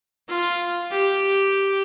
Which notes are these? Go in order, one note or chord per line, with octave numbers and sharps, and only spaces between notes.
F4
G4